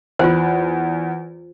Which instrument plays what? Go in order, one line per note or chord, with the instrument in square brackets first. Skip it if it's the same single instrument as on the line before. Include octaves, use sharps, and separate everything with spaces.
[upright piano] E2 [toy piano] F4 C5